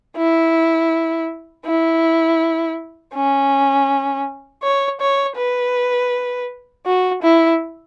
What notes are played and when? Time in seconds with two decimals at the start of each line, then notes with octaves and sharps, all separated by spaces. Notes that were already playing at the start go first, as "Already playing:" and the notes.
0.17 E4
1.66 E4
3.14 C#4
4.63 C#5
5.00 C#5
5.37 B4
6.86 F#4
7.23 E4